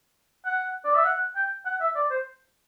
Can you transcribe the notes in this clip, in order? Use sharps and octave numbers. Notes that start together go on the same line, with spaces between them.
F#5
D5
E5
F#5
G5
F#5
E5
D5
C5